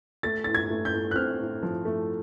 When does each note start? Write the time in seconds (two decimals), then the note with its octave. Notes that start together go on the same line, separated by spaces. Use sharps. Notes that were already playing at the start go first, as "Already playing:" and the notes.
0.23 A3 A6
0.44 A2 A6
0.55 G#6
0.70 A3
0.85 G6
0.93 A3
1.11 F#6
1.15 C4 F6
1.39 A2
1.63 F3
1.85 A3